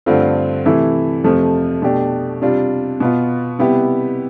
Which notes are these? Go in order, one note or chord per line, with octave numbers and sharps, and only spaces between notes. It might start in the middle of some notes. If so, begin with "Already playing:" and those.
G2 D3 A3 C4 F4
C3 E3 A3 E4
F2 C3 F3 A3
B2 A3 D4 G4
C3 G3 D4 F4
B2 B3 F4
C3 G3 B3 E4 G4